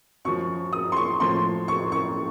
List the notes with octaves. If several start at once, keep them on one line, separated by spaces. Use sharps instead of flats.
F#2 F3 C#6
D#6
C6
C#6
A2 F3 C6
C#6
C#6